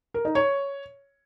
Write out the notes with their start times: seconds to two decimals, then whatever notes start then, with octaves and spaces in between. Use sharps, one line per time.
0.14 A#4
0.25 D#4
0.35 C#5